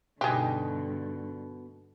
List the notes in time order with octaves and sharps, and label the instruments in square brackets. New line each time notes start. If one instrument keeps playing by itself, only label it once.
[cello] G2 D3 [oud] B2 D#4 [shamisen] G4 G#4